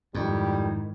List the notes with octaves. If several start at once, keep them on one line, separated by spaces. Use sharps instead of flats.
F2 G#2 D#3 G3 D#4 E4